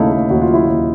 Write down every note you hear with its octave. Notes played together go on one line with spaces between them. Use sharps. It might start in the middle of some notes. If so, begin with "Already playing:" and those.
Already playing: D#2 C#3 A3 D#4 E4
A3
D#2 F#4
F4
F#3 E4
D#2 F4